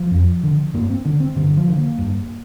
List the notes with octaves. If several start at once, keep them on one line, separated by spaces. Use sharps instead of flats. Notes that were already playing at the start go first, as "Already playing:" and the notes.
Already playing: F3
F2
D3
G2 A#3
C4
D3 D4
C4
G2 D3
F3
D3
A#3
G2